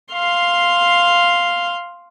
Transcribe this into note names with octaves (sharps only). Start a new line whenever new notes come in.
F5 C6